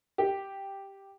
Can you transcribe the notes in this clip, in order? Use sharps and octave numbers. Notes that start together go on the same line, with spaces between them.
G4